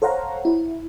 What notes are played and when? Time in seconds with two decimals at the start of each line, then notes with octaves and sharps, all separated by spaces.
0.02 A4 C5 C#5 F5 F#5 A#5
0.45 E4